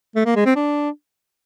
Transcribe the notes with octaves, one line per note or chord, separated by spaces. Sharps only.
A3
A#3
G#3
C4
D4